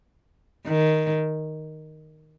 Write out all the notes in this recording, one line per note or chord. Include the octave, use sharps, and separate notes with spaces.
D#3